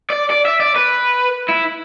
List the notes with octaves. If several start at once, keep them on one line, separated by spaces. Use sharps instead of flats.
D5
D5
E5
D5
B4
E4